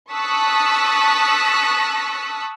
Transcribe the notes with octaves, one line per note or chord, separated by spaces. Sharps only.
A5 C#6 D#6 E6 F#6 B6